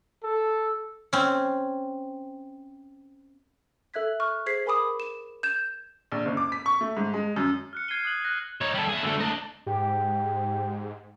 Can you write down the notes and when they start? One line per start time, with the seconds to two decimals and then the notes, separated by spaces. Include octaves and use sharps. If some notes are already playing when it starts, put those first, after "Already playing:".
0.23 A4
1.13 C4 C#4
3.94 A4 E5 F#6 G#6 B6
4.20 C#6 F6 F#6
4.46 G#4 C5 G#6 B6 C7
4.66 A#4 G#5 B5 D6 D#6
5.00 E7
5.43 G6 G#6 E7
6.12 A#1
6.25 F#1
6.37 D6
6.52 B6
6.66 C#6
6.81 A3
6.97 G#2
7.14 G#3
7.36 F#2
7.73 F6 F#6 C#7
7.88 F6 G#6 C7 C#7 D#7 G7
8.05 D#6 F#6 F#7 G7
8.25 F#6 A#6
8.61 D#4 C#5
8.75 G3 A4
8.88 G#4 E5
9.03 D3 A3
9.20 D4 D#5
9.66 G#2 G4